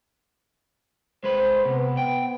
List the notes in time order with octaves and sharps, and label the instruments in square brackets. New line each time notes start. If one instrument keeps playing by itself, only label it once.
[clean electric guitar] G#3 B4 [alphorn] C5
[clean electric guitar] C3 [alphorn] B3
[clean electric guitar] G5